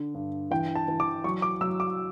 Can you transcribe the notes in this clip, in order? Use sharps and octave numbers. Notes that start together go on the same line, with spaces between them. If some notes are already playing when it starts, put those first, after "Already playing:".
Already playing: D3
G2
E3 G5
A5
E3
D6
F#3 C#6
D6
F#3 E6
D6